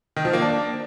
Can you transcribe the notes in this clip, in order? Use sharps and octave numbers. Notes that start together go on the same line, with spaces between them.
D#3
F3
A#3
D4